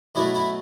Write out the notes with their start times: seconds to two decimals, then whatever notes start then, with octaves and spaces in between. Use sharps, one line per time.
0.15 B2 F#3 A3 E4
0.34 E4